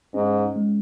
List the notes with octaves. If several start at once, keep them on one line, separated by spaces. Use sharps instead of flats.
G#2 C#4
G#3